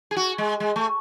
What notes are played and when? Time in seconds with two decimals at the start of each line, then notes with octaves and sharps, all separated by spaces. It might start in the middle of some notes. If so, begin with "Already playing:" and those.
0.11 G#4
0.16 F#4
0.38 G#3
0.60 G#3
0.76 A3